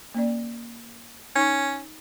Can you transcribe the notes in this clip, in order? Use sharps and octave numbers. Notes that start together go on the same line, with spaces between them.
A#3 C#4 D5
C#4 D#4 C#6